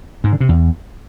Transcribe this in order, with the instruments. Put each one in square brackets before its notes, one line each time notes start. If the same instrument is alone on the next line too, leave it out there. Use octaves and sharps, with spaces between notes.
[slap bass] G#2
D3
C3
E2